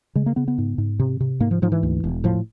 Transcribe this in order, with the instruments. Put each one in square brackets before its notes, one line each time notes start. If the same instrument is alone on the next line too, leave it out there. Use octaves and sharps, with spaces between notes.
[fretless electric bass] C#3 G#3
A#3
C#3 B3
B3
G#2
G#2
C3
C3
G#2 A#3
F3
G#2 F3
E3
D2
E1
A2 F3